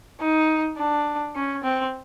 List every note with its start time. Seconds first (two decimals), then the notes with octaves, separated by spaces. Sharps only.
0.20 D#4
0.78 D4
1.35 C#4
1.63 C4